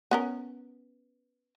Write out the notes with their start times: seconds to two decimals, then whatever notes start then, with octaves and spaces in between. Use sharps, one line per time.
0.11 B3 C#4 A#4